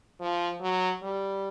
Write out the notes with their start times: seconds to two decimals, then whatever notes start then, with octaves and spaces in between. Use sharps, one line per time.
0.20 F3
0.60 F#3
1.03 G3